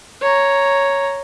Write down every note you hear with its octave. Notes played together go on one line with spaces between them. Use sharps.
C#5 A#5